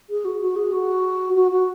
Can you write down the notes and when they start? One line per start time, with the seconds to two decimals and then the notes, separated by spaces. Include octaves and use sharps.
0.10 G#4
0.25 F#4
0.41 F#4
0.56 G#4
0.72 F#4
1.36 F#4
1.51 F#4